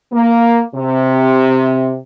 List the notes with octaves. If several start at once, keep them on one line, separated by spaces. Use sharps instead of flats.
A#3
C3